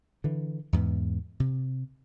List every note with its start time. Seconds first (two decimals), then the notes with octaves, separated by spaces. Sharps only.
0.24 D3 E3
0.73 E2 G#2 A#3 B3
1.40 C3